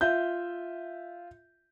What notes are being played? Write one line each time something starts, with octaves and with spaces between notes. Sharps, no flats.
F4 E5 G6